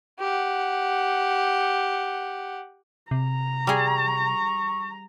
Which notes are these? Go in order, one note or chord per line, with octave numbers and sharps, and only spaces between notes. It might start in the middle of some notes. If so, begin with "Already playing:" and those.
G4 F#5
C3 A#5
G3 G#4 C#6